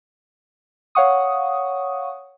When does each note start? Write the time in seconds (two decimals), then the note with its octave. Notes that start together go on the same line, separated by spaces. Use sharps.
0.95 C#5 F5 F#5 C#6 D#6